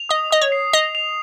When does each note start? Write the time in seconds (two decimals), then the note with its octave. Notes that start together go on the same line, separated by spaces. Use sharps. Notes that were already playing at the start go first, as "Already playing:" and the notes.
Already playing: F7
0.09 D#5 D#6
0.31 D#5 D#6
0.41 C#5
0.52 C7
0.73 D#5 F7
0.95 F7